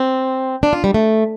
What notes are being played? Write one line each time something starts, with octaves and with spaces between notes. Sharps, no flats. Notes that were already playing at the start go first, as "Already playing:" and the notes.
Already playing: C4
D4
F4
G3
A3